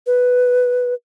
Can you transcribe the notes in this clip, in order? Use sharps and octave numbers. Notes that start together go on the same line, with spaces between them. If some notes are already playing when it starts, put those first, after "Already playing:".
B4